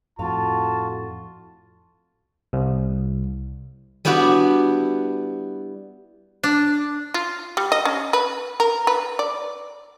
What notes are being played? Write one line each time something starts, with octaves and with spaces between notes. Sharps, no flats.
F2 A2 F4 F#4 F5 A5
C2
G3 B3 D4 E4 F#4
D4
F4
G3
D#5
C#4
B4
A#4
B4
D5